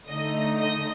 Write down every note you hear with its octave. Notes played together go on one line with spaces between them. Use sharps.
D3 A3 D#4 D#5
D#5